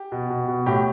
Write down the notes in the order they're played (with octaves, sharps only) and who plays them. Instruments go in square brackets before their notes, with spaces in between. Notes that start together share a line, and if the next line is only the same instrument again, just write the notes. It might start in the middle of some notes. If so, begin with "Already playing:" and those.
Already playing: [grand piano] G4
B2
B2
B2
A2 G4